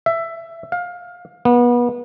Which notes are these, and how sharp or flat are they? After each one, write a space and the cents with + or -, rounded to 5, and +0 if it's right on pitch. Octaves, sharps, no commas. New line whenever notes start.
E5 +15
F5 +20
B3 -30